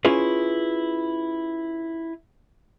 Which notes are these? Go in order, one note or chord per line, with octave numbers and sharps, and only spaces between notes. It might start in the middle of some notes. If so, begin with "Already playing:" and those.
C#4 E4 F4 G#4 B4